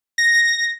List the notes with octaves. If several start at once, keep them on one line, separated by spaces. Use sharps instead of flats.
A#6